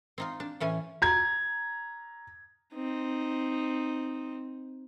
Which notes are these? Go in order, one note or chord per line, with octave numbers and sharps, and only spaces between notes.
C4 D#4 F4
D4
A2 E3 C#4 G#5
A#5 G#6
C4 D#4